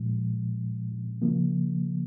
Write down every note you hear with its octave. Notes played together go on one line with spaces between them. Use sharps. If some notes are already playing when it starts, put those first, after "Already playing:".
Already playing: A#2 F3 G#3
C#3 F3 A#3